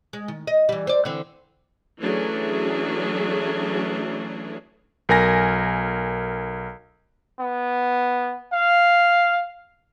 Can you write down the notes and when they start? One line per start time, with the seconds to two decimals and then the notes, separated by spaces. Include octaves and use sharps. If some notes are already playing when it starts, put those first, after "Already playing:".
0.13 G#3
0.28 D#3
0.47 D#5
0.69 E3 G3
0.87 C5 D5
1.05 D3 E3 C4
2.00 E3 F#3 A3 C#4 D4 G#4
5.09 B1 A#4 G#5 A#6
7.39 B3
8.53 F5